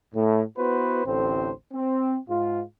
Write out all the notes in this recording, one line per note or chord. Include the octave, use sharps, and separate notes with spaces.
A2
B3 E4 F#4 B4 C5
A1 D2 A2 C4 C5
C4
G#2 F4